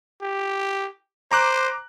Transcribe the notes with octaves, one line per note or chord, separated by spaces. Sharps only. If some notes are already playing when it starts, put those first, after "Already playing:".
G4
C5 A#5 D6 F#6